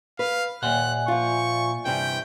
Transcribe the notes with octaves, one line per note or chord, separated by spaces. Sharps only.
B4 F5
D#2 A#2 D5 E5 F#5 G#5 C6 F#6
F3 F4 C#6
G2 C3 E3 G5